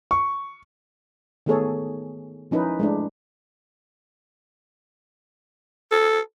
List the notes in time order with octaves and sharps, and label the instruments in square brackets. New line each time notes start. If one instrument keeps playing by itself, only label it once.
[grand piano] C#6
[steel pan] D#3 A3 B3 G#4 A4 C#5
F3 C#4 D#4 E4 B4
G#3 A3 D4
[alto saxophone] A4